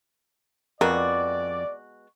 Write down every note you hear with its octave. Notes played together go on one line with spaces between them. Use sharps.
F2 G#3 B3 F#4 A#4 D5